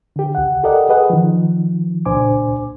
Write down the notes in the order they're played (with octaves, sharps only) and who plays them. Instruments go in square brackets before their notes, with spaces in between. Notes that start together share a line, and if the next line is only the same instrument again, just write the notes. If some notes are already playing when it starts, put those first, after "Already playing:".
[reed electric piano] D3 G4
C#2 F#5
G4 A4 A#4 D5 D#5 F#5
G#4 B4 D#5 F#5
D#3 F3
C#2 A#2 D4 C5 G#5 D6